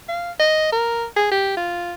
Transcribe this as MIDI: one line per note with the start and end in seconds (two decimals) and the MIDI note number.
0.09 0.31 77
0.39 0.69 75
0.72 1.05 70
1.16 1.27 68
1.31 1.53 67
1.57 1.94 65